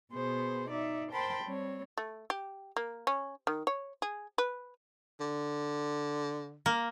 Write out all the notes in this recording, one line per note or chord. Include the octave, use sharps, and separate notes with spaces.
B2 B3 G#4 C5
D#4 D5 E5
A#4 C5 G5 A5 B5 C6
G3 C4 C#5
A3
G4
A#3
C#4
D#3
C#5
G#4
B4
D3
A#3